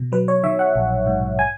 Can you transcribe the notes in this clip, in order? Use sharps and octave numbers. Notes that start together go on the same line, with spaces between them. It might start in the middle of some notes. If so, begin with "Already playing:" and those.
Already playing: B2
F#3 B4
C#5
D#3 E5
F#5
A#1
G#2
G#5